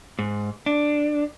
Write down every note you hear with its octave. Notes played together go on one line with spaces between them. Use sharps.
G#2
D4